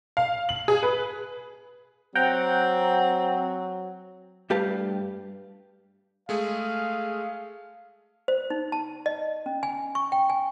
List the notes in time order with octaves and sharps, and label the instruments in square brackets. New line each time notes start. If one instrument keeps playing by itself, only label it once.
[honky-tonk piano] F5
F#7
G#4
B4
[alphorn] F#3 [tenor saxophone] C4 [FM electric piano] F#5 G5 A#5
[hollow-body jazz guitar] G2 A3 G4 B4 F5 A5
[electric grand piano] G#3 A3 G#4 [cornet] F5
[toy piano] C5
D#4
A5
D#5
C#4
G#5
C#6
G5
G#5